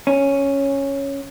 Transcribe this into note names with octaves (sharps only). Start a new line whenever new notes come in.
C#4